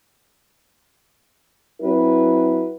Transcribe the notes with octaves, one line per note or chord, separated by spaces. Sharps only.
F#3 C4 E4 B4